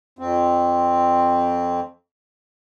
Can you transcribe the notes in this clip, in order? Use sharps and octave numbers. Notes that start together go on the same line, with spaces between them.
F2 C4